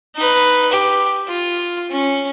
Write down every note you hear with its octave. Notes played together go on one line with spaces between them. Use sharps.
D#4 B4
G4
F4
C#4